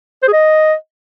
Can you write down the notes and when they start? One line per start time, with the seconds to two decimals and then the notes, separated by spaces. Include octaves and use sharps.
0.22 C5
0.28 G#4
0.33 D#5